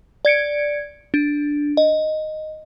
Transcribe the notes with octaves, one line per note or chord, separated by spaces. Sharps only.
D5 G#6 C#7 D7
D4
D#5